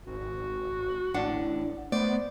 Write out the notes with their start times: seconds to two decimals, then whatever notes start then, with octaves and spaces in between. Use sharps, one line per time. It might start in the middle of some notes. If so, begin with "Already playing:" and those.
0.07 G#1 F#4
1.14 A1 A2 D4 D5 F#5
1.92 A3 B3 C5 D5